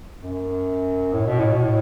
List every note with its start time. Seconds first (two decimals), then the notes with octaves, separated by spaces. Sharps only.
0.22 F#2
1.13 A2
1.26 B2
1.39 A2
1.52 B2
1.65 A2